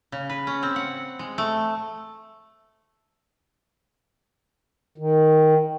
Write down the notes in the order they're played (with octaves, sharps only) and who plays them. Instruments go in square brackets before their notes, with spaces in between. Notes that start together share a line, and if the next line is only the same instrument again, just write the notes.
[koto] C#3
B4
C#4
C4
F#5
G#3
A3
[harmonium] D#3